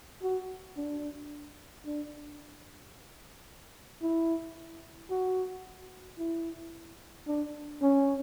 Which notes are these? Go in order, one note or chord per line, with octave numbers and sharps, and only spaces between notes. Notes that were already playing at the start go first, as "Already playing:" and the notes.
F#4
D4
D4
E4
F#4
E4
D4
C#4